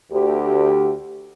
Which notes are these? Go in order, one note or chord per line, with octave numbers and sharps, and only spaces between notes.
D2 G4